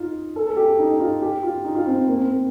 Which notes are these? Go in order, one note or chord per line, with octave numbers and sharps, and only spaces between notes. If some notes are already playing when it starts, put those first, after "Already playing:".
Already playing: D#4 F4
A4
A4
G4
D#4
D#4
F4
G4
F4
D#4
F4
C4
A#3
C4
A#3